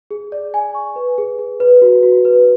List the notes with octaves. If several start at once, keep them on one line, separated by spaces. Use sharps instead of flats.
G#4
D5
G#5
C#6
B4
G#4
G#4
B4
F#4
F#4
B4